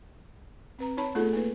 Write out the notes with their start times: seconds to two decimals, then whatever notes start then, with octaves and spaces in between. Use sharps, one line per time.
0.79 C4 B4 A#5
0.97 D#4 C#5 A5 B5
1.15 A3 B3 D#4 F4 G#4 A4
1.33 A#3 D#4 B4